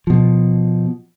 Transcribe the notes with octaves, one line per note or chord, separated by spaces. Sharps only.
B2 F3